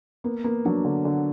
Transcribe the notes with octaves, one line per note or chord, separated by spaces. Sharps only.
A#3 B3
A#3 B3
F#3 D4
D3
D3